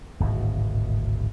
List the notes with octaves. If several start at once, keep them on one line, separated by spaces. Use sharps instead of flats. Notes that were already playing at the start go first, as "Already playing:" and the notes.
D1 G#1 B2